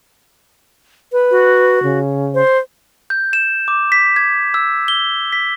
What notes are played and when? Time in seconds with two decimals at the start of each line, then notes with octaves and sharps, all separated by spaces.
1.12 B4
1.31 F#4
1.83 C#3
2.34 C5
3.10 G6
3.33 E7
3.68 D6
3.92 B6
4.16 G#6
4.54 E6
4.88 G7
5.33 B6